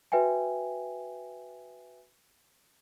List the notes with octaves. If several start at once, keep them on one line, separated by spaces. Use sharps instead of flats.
F#4 B4 E5 G5 G#5